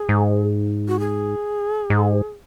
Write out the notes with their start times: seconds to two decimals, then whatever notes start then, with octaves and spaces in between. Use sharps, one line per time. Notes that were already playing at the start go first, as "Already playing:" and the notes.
Already playing: G#4
0.09 G#2
0.88 F#4
1.00 G#4
1.90 G#2